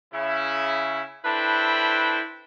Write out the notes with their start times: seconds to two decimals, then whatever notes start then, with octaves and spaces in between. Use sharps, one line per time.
0.13 C#3 E4
1.25 D4 E4 A4 B4 C5 G5